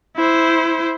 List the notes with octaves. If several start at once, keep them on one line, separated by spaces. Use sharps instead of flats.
E4 C5